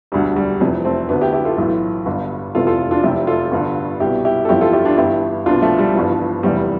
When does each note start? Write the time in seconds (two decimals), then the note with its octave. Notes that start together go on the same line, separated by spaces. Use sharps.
0.12 E1 D2 D3 G3
0.36 G3
0.60 F1 F2 C3 E3
0.85 A3 C4
1.09 D2 D3 B3 D4
1.21 E4 G4
1.33 E4 G4
1.45 F4 A4
1.58 B1 A2 E3
2.06 G1 G2 D3
2.55 F1 E2 C3 E3 F4 A4
2.67 F4 A4
2.91 D4 F4
3.03 F1 F2 C3 E4 G4
3.27 F4 A4
3.52 G1 G2 D3
4.00 C2 B2 E4 G4
4.25 E4 G4
4.45 A4
4.49 G1 F2 E3 E4 G4
4.61 F4 A4
4.73 E4 G4
4.85 D4 F4
4.97 G1 G2 E3 E4 G4
5.46 C2 B2 D4 F4
5.62 F3 A3
5.79 G3
5.95 G1 G2 E3 F3
6.43 F1 E2 C3 E3 G3